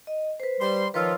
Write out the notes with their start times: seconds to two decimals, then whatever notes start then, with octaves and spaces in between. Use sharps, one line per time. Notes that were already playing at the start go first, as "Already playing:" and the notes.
0.07 D#5
0.40 B4 C5
0.61 G3 C6
0.94 D#3 F3 F4 B4 C#5 E6